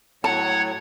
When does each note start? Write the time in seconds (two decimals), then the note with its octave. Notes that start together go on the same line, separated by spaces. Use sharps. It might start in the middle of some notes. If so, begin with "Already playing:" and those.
0.24 A2 F#3 C#5 F#5 A5 G#6